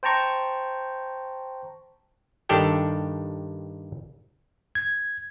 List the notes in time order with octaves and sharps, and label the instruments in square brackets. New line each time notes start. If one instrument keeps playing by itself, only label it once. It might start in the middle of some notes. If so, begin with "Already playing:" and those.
[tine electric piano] C5 G5 A5 A#5 C#6
[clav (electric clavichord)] G2 D#3 D4 G4 A4 G5
[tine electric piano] G#6